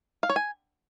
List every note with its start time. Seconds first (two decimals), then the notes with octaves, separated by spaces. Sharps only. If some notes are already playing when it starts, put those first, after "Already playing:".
0.23 F5
0.30 C#5
0.36 G#5